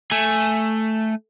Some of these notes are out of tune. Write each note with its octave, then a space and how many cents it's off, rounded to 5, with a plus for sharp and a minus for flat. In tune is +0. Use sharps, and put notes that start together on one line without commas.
A3 +0 G#5 +0